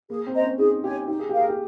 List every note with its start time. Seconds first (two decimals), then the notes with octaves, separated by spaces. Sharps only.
0.09 A#3 G#4
0.27 C4
0.34 C5 D#5 A#5
0.42 C#4
0.59 D#4 G#4
0.84 G4 C#5 G#5
1.08 D#4 G4
1.19 G#4
1.29 G4
1.33 A#4 F5
1.40 G#4
1.49 G4